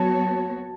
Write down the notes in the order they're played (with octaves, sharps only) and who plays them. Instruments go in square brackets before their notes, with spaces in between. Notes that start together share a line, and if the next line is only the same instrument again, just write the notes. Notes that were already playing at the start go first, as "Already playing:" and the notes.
Already playing: [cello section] F#3 B3 F#4 C#5 [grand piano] A5